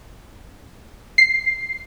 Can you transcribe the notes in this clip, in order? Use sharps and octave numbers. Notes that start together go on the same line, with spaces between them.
C7